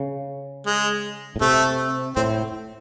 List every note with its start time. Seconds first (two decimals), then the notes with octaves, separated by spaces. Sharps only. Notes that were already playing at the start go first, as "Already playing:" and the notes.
Already playing: C#3
0.66 G#3
1.36 A2
1.41 C3 A3
2.16 A2 C4